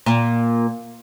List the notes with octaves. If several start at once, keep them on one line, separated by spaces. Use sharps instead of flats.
A#2